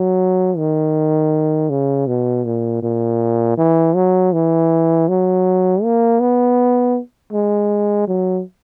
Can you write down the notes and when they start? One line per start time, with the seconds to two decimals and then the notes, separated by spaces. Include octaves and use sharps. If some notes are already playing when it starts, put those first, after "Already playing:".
Already playing: F#3
0.57 D#3
1.70 C#3
2.07 B2
2.45 A#2
2.82 A#2
3.57 E3
3.95 F#3
4.32 E3
5.08 F#3
5.83 A#3
6.20 B3
7.33 G#3
8.08 F#3